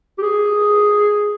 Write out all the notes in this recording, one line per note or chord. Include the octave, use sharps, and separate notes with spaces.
G4
G#4